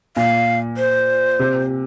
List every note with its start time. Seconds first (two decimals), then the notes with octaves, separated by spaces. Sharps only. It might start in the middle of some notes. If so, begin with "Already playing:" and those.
0.17 A#2 F5
0.77 C5
1.39 C3